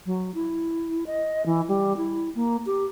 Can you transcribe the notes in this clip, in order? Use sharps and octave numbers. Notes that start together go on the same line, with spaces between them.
F#3
E4
D#5
E3
G3
E4
A#3
G4